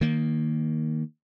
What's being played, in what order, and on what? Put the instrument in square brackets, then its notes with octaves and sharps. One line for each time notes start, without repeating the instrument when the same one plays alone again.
[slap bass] D#3 A#3